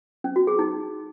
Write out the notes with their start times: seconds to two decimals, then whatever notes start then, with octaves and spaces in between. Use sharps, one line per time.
0.24 C#4
0.36 F#4
0.47 G#4
0.59 D#4